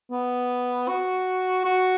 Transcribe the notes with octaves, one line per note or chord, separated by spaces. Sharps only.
B3
F#4
F#4